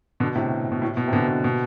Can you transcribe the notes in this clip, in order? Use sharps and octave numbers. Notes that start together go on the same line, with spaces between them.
B2 D3
A2 C3
B2
A2
B2
C3
B2 D3
B2
B2